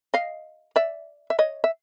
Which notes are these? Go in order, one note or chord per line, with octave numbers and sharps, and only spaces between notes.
D#5 F5
D5 E5
E5
C#5 D#5
E5